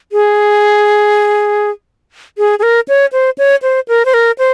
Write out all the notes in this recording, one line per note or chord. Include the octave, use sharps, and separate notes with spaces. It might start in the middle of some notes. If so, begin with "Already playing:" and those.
G#4
G#4
G#4
A#4
C#5
C5
C#5
C5
A#4
C5
A#4
C5